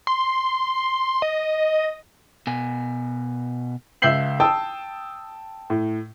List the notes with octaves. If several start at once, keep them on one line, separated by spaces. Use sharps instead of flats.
C6
D#5
B2 G#5
C#2 E5 E6 G6 C7 F#7
G5 A5 D#6 E6
A2